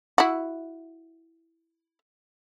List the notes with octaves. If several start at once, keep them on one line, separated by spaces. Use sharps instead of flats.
E4 F#4